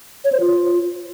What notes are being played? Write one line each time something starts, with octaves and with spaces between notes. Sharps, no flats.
C#5
C5
F4